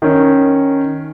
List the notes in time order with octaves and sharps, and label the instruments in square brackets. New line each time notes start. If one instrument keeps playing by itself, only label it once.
[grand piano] D#3 C#4